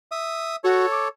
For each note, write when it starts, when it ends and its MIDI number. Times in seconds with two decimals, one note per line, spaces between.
0.12 0.56 76
0.12 0.56 87
0.64 0.86 66
0.64 1.08 69
0.64 1.08 73
0.91 1.07 86